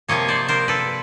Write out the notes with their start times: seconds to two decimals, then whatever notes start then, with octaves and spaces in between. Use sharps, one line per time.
0.09 C3 F3 A#3 C#5 D#5
0.28 C5 D5
0.48 A#4 C5
0.68 A4 B4